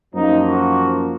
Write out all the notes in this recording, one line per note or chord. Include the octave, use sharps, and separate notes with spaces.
F#2 F3 A#3 D#4
F#4